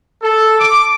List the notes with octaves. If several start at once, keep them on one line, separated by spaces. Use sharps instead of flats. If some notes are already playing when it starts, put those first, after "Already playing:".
A4
D6